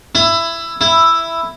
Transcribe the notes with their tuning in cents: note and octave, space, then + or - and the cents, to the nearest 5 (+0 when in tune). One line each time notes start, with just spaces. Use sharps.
E4 +15
E4 +5